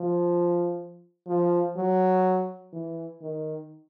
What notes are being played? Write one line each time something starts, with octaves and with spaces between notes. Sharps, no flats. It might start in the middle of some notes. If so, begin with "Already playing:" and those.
Already playing: F3
F3
F#3
E3
D#3